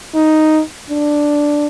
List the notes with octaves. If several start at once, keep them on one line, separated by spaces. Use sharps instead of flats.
D#4
D4